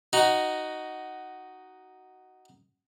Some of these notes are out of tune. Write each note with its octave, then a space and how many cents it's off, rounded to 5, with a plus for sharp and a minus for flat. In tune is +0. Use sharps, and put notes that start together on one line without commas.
D#4 +0 F#4 +10